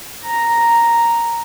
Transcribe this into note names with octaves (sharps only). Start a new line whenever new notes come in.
A#5